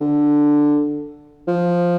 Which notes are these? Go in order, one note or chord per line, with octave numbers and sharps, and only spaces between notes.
D3
F3